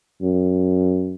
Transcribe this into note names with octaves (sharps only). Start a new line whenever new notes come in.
F#2